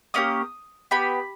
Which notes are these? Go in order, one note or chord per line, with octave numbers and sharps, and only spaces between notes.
A#3 C#4 G4 D#6
B3 G4 B5